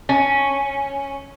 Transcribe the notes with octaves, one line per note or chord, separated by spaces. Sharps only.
C#4